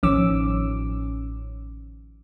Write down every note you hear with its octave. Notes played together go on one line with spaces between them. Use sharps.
A1 D#3 F3 C#4 D6 E6